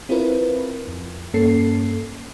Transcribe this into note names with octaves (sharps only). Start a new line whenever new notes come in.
C4 E4 F4 A#4 B4
F2
G2 A#3 C#4 A4 C7